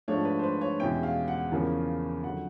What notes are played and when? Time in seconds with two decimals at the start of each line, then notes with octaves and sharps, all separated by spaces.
0.08 G#2 F3 A3 D4 C#5
0.25 B4
0.39 C5
0.43 B4
0.61 C#5
0.79 E2 B2 G#3 C#4 E4 G5
1.03 F5
1.28 F#5
1.51 E2 C#3 F3 A#3 C#4
2.24 F2 D3 F#3 F#5